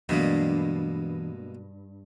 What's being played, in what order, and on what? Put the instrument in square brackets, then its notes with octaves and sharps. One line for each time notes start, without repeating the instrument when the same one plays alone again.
[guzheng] G2 [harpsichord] B2 G#3 A#3 [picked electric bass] E3 F#3